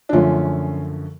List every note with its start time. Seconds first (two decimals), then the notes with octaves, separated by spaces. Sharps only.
0.09 D4
0.12 F#2 D3 F3 A3 C#4 F4